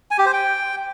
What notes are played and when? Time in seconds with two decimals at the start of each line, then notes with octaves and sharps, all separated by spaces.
0.11 G#5
0.18 G4
0.26 C5
0.33 G5